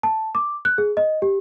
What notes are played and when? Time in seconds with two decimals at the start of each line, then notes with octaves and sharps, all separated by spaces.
0.03 A5
0.35 D6
0.65 F#6
0.78 G#4
0.97 D#5
1.22 G4